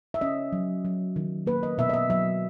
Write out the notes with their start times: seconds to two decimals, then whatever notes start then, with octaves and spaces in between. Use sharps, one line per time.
0.14 E5
0.21 C#4 D#5
0.52 F#3
0.85 F#3
1.16 D#3
1.46 A#3 B4
1.63 D#5
1.78 B2 E5
1.89 D#5
1.94 E5
2.10 F#3 E5